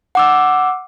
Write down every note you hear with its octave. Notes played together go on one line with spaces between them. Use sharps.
F#5 D6 E6